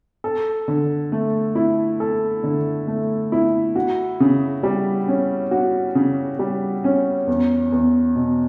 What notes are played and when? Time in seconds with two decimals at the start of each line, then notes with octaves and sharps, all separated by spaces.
0.24 A4
0.68 D3
1.12 A3
1.55 E4
2.00 A4
2.44 D3
2.87 A3
3.32 E4
3.76 F#4
4.20 C#3
4.63 G3
5.08 C#4
5.51 F#4
5.95 C#3
6.39 G3
6.84 C#4
7.27 E2
7.72 E2
8.15 B2